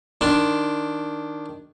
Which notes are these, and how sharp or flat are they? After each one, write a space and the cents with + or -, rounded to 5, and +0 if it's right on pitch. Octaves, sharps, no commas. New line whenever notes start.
D#3 +0 D4 +0 C6 +0